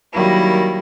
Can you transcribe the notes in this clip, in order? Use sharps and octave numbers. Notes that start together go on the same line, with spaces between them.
D#3 F#3 G3 A#3 E4